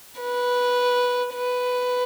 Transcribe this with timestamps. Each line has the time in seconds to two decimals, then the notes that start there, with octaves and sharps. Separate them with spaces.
0.20 B4
1.34 B4